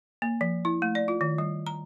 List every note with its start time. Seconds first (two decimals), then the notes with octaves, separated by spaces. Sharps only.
0.22 A#3
0.41 F3
0.65 E4
0.82 A3
0.95 D5
1.08 F4
1.21 D#3
1.38 G3
1.67 A#5